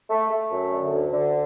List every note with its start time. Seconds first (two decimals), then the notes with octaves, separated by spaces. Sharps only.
0.10 A3
0.31 A3
0.51 F#2
0.73 D3
0.92 D2
1.13 D3